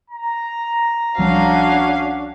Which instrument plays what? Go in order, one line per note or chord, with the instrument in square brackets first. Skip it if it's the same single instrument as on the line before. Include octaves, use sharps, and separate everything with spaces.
[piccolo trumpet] A#5
[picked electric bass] C2 F3 G3 [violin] C#4 F5 [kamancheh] D4 F#4